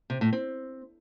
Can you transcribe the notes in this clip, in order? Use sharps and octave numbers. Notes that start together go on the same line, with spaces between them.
C3
A2
C4